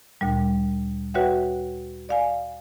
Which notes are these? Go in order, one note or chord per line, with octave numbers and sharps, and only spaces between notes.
D2 A#2 G3
F#4 B4 C#5 E5 F#5 G5
D5 F5 G#5